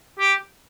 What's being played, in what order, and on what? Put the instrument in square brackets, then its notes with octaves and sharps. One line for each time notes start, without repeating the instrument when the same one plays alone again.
[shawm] G4